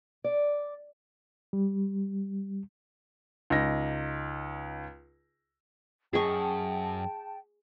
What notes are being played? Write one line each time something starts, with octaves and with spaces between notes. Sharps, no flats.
D5
G3
C#2 D#4 A#6
F#2 G#4 G5 A5 C#6